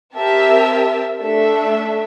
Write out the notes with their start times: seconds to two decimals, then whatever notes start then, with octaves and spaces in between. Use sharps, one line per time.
0.15 C4 G4 A#4 E5 A5
1.19 A3 D4 A4 E5